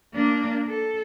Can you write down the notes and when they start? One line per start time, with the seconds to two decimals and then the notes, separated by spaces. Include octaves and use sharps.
0.14 A#3 D4
0.68 A4